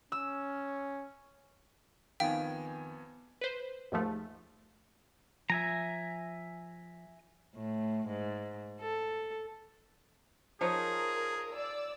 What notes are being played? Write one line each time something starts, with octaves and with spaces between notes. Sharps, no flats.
C#4 E6
F2 D#3 B3 F5 G5 G#5
B4 C5
D#2 G#2 F3 A3
F3 E5 G#5 A#5
A2
G#2
A4
F3 D#4 G#4 A#4 C#5
D5 E6